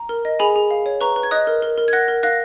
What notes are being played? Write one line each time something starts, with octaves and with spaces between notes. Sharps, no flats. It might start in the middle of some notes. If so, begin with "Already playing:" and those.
Already playing: A#5
A#4
D#5
G#4 G#5 B5
G#4
F5
C#5
B4 A#5 C#6
B4
G#6
D#5 D#6 F#6
A#4
A#4
A#4
G#6
F#5 F#6 A#6
A#4
F5 F#6 A#6